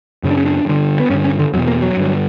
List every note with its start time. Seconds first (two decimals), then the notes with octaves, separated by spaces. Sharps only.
0.23 F#2 C#3
0.30 D4
0.37 C#4
0.45 D4
0.66 G2 D3
0.99 B3
1.10 G2 C#4
1.14 D3
1.24 C#4
1.39 D3
1.53 E2 F#3
1.57 B2
1.68 A#3
1.82 F#3
1.97 G2 D3